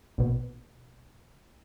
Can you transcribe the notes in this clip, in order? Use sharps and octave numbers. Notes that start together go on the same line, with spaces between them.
A#1 B2